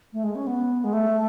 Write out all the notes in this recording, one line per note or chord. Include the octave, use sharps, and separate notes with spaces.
A3
G#3
C#4
B3
G#3
A3